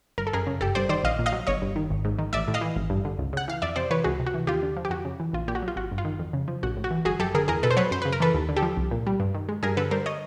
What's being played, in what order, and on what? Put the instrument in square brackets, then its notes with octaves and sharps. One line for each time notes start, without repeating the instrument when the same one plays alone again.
[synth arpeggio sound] G1 A#4
A4
F#2 G#4 A#4
C#3
G1 G4 A4
G2 C5 D5
D#3 C5 D5
A#1 D#5 F5
A#2
D#5 F5
F#3
G1 C#5 D#5
G2
D#3
G#1
G#2
D#3
A1 D5 E5
A2
D#5 F5
E3
G#1
G2
D3
C#2
C#3 F#5
E3 F5
F2 D5 E5
C3 C5 D5
E3 B4 C#5
C#2 F#4 G#4
C3
F#4
E3
D#2 F4 G4
D3
F3
G4
F2 F#4
C#3
E3
A#1 F4
A#2 G4
F#4
F#3
F4
G#1 F#4
G2
F4
D#3
F2
C#3
F3
A#1 F#4
A2
F#4
E3
G1 F#4 G#4
F#2 G4 A4
D3 G#4 A#4
E2 G#4 A#4
B2 A4 B4
C5
F#3 B4 C#5
F#2 C5
C#3 B4
A#4
E3 A4 B4
D#2
D3
G4 A4
F3
C2
A#2
G3
G2
D#3
G#3
G2 G#4 A#4
D3 A4 B4
G3 A#4 C5
C#5 D#5